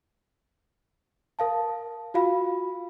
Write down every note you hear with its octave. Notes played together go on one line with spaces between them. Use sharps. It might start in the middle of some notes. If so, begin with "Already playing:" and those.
A#4 F5 A5
F4 F#4 F5 B5